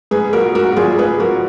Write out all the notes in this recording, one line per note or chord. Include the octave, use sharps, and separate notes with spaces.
G#2 G#4 B4
A#1 F#4 A#4
G#2 F#4 A#4
F#4
G#1 F4 G#4
G#2 G#4 B4
F3 F#4 A#4